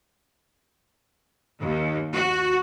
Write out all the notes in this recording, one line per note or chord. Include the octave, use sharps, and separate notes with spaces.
D#2
F#4